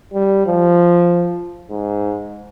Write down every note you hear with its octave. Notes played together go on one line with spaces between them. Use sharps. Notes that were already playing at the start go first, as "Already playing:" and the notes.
G3
F3
G#2